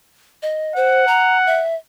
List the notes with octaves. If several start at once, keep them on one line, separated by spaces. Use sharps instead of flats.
D#5
C5 F#5
A#5
E5